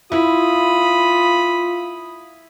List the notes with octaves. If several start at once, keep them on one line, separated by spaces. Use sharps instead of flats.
E4 F4 B5 D#6